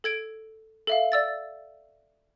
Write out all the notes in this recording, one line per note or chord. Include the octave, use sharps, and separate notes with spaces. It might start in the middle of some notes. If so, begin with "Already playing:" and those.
A4 G#6 D7
A4 E5 F5
D5 E6 A6